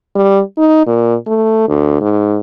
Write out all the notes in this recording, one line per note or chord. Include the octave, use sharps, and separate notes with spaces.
G3
D#4
A#2
A3
D2
G#2